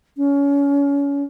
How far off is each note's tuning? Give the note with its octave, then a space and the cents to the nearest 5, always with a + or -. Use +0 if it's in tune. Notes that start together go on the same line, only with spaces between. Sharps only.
C#4 +30